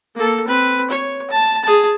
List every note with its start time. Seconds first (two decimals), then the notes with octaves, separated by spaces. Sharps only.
0.15 A#3 A4
0.47 C4 B4
0.90 C#5
1.31 A5
1.64 G#4 A5